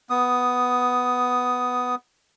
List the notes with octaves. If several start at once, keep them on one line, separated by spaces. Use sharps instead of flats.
B3 D#6